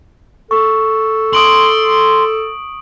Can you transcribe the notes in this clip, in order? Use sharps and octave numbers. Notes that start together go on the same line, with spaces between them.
A4 C#6
C6 D#6 D7 F#7